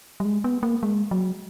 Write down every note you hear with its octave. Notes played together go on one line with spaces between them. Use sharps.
G3
G#3
B3
A#3
G#3
F#3